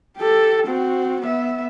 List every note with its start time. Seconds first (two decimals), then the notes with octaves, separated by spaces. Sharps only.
0.17 G4 A4
0.66 C4 F#4
1.21 B3 E5